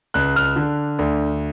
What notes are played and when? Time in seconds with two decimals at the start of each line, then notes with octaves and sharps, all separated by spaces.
0.14 C#2 F#6
0.36 F6
0.56 D3
0.99 D2